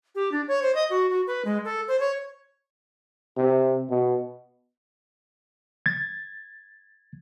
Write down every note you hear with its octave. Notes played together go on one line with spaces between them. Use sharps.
G4
D4
C#5
C5
D#5
F#4
F#4
B4
G#3
A4
C5
C#5
C3
B2
G#6 A6